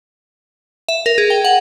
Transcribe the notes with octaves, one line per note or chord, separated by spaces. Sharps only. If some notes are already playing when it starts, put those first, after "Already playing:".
E5
A#4
G#4
G5
F#5